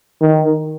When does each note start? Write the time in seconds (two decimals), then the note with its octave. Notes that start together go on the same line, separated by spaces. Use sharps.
0.21 D#3